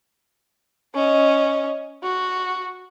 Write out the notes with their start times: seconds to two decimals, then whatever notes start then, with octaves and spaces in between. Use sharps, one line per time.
0.95 C#4 D#5
2.03 F#4